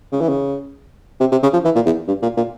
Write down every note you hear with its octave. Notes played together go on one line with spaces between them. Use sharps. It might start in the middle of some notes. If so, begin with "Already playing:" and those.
C#3
E3
C#3
C3
C3
C#3
F3
E3
A#2
E2
G2
A#2
A#2